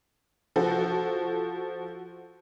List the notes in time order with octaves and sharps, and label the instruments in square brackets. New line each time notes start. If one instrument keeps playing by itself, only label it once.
[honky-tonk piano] F3 F#4 A4